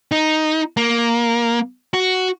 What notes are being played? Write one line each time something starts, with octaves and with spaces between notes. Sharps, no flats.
D#4
A#3
F#4